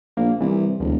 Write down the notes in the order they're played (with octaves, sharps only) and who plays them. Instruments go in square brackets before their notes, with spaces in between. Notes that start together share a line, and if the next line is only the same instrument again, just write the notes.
[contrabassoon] A#1 [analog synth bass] A#3
[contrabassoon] C2 [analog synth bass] E3
[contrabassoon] E1 [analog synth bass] D2